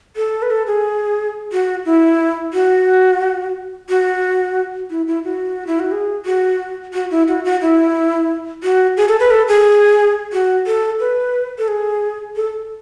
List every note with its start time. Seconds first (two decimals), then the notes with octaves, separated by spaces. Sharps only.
0.16 A4
0.42 B4
0.51 A4
0.67 G#4
1.52 F#4
1.85 E4
2.54 F#4
3.89 F#4
4.90 E4
5.08 E4
5.24 F#4
5.67 E4
5.80 F#4
5.92 G#4
6.26 F#4
6.94 F#4
7.11 E4
7.28 F#4
7.45 F#4
7.61 E4
8.63 F#4
8.97 G#4
9.08 A4
9.20 B4
9.31 A4
9.48 G#4
10.33 F#4
10.67 A4
11.00 B4
11.58 A4
11.68 G#4
12.36 A4